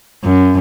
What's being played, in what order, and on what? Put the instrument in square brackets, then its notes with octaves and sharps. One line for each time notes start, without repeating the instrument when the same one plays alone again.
[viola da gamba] F#2